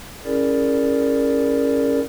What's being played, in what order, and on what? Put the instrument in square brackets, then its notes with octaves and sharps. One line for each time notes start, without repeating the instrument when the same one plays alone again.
[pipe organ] C#4 E4 G#4 A#4 D5